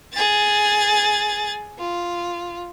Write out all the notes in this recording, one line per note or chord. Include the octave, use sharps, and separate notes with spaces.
G#4 A6
F4